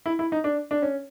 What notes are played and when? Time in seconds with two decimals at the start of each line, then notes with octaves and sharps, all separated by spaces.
0.06 E4
0.19 E4
0.32 D#4
0.44 D4
0.71 D4
0.82 C#4